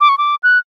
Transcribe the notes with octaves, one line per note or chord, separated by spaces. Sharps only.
D6
C#6
D6
F#6